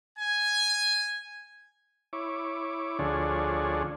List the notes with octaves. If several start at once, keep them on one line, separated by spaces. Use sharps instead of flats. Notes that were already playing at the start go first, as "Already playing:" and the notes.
G#5
E4 C#5 D6
D2 D3 F3 D4 G#4 C#5